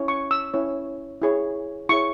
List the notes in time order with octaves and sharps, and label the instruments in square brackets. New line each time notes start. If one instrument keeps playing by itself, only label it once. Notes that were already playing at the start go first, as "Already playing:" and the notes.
Already playing: [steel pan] C#4 E4 C#5
C#6
E6
C#4 E4 C#5
E4 G#4 C#5
E4 G#4 C#5 C#6